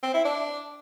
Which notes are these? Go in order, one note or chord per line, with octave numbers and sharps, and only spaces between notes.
C4
E4
D4